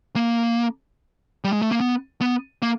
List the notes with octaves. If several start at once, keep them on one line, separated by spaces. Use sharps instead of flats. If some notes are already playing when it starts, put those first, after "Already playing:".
A#3
G3
G#3
A3
A#3
B3
B3
A#3